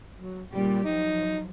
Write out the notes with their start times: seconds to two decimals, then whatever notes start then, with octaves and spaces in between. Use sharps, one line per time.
0.17 F#3
0.52 A#2 C#3 G3 G4
0.84 F3 F#3 D#4